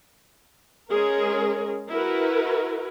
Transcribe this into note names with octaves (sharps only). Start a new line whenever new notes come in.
G#3 C#4 G#4 A#4
E4 F#4 A#4 B4